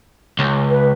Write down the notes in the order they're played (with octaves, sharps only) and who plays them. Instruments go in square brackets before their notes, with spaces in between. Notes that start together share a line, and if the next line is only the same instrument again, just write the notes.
[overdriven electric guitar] C#2
[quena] B4